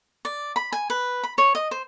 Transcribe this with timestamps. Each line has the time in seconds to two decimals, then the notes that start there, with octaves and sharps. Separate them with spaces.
0.25 D5
0.56 B5
0.72 G#5
0.90 B4
1.24 B5
1.38 C#5
1.55 D#5
1.71 C5